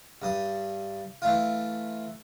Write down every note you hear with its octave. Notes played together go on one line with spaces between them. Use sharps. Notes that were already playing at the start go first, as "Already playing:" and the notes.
G2 D#6
E3 A3 F4